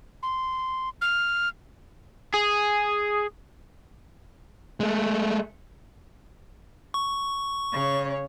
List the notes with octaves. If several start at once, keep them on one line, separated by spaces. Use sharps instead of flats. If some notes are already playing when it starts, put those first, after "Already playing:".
C6
F6
G#4
G#3 A3
C#6
C#3 C#5